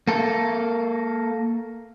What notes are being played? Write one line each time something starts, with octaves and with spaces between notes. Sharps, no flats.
A#3 A4